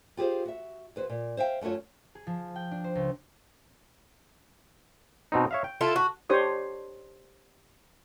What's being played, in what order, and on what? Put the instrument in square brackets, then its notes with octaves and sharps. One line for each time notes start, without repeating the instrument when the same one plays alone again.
[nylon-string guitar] F4 G4 G#4 C5 F5
F#4 E5
D#2 B4 C5
A#2
C5 E5 F5 G5
F#2 A3 F4 F#4 C#5
[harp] G#4
F3
G5
D4
C5
C#2
[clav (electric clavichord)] B2 C4 D#4
C#5 E5 F5
G5
[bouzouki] E4 F4 A4
F#4
[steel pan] D4 G4 C5 C#5 D#6